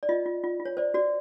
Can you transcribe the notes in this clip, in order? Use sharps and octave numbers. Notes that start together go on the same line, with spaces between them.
D5
F4 D#5
F4
F4
F4
C#5
C5 D5
F#4 D5